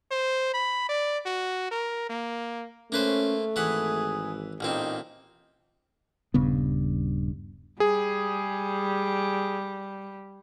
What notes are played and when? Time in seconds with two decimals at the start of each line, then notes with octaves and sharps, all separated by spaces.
0.12 C5
0.54 B5
0.89 D5
1.26 F#4
1.71 A#4
2.10 A#3
2.92 A3 A#3 C#4 B4 C5
3.56 G#1 E3 G#4 F#5 B5
4.60 A1 A#2 C4 D#4
6.34 D#1 G2 C#3 B3
7.80 G3 G#4